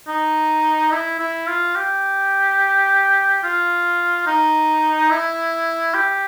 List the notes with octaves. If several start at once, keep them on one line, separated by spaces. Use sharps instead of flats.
D#4
E4
E4
F4
G4
F4
D#4
E4
G4